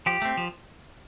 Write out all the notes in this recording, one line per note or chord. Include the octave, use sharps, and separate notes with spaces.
F3 G4
A3 C4
F3